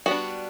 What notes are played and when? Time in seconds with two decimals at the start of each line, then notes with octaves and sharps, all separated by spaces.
0.06 G3 B3 D4 F#4